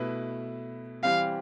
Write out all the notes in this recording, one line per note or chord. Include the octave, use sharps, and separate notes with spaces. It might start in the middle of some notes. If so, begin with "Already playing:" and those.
Already playing: B2 A3 E4 B4
E3 G3 C4 G4 F5